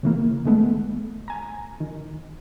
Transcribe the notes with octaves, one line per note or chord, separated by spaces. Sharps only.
C#3 E3 A#3
D#3 G#3 A3 B3
G#5 A#5
D#3